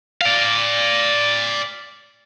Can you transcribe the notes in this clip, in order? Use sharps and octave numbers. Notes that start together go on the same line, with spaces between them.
D5 F5